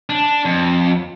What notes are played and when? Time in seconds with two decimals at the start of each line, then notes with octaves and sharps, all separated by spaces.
0.10 D4
0.45 F2